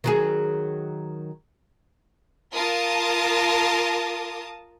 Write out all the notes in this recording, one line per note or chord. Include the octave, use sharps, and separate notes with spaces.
D#3 F#3 G#4
F4 A#4 A5 D#6